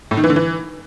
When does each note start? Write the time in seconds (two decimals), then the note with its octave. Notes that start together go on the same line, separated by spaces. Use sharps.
0.11 A2
0.17 D#3
0.24 E3
0.30 D3
0.36 E3